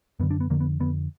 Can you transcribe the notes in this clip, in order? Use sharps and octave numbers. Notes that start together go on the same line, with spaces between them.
F#2 D3 B3
D4
B3
F2 D3 A#3
B3
F2 D3 B3